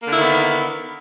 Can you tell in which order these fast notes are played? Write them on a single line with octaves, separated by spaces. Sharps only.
A#3 D3 E4 D#3 B3